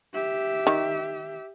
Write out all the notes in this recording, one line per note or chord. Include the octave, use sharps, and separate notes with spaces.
G4 E5
D#3